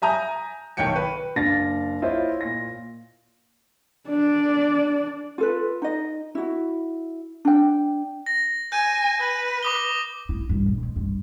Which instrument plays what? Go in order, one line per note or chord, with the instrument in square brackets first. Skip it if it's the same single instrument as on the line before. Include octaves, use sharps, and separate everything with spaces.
[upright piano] E5 G#5 A#5 D#6 G6
B1 D#3 C#5 G5 C#7
B4
[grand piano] F#1 D4 F5 A5 A6 A#6
E4 F4 C5 C#5 D#5
A#2 A#6
[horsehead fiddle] D4 D5
[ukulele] F4 A4 B4
D#4 D#5
E4 F#4
D4 G5
[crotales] A#6
[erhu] G#5 [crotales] G6 D#7
[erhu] B4
[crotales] D6 D#6 G7
[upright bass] E4
G2
A#1
F2
G2